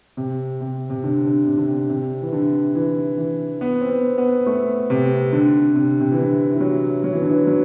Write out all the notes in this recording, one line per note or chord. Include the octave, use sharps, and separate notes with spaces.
C3
C3
C3
D3
D3
C3
D3
C3
C3
E3
D3
E3
E3
B3
C4
B3
B3
A3
C3
D3
C3
C3
E3
D3
E3
F#3
F#3
E3
D3
E3
F#3